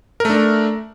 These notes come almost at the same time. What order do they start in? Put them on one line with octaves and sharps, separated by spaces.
A#4 A3 D4